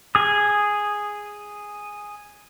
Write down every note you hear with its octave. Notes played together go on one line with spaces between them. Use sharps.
G#4 D#6